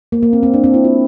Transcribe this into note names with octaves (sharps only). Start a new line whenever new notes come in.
A#3
A#3
C4
C4
D4
C4
E4
F4